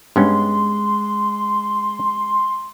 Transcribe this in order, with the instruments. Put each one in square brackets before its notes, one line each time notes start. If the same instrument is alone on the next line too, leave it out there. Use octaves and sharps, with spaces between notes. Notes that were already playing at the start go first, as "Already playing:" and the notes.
[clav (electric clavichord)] G2 B3 C#4 [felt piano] G#3 [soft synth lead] C6